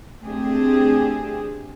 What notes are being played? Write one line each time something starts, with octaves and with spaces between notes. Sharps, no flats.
A3 C4 D4 G4 G#4